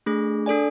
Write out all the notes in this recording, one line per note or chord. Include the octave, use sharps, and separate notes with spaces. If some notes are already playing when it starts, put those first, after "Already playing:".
A3 D4 G#4
D4 A4 D5 G#5